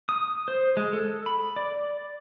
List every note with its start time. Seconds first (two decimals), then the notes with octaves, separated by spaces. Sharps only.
0.09 D#6
0.48 C5
0.77 G#3
0.93 A4
1.26 B5
1.56 D5